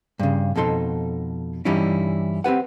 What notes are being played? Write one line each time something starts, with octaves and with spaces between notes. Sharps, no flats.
G2 C#3
F2 B2 D#4 A4 C6
G2 E3 G3 C#4 D#4 E4
C4 G4 B4 F#5